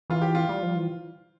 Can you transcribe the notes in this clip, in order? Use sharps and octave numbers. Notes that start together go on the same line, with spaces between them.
E3 F4
G4
F4
G3
F3
E3